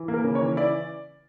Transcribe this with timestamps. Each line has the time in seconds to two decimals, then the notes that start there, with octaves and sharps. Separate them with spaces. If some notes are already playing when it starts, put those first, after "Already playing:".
Already playing: E3
0.08 A#3
0.14 A#4
0.24 C#3
0.35 C#5
0.41 E3
0.57 E4 D5